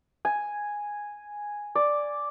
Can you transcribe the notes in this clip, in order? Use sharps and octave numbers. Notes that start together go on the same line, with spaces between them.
G#5
D5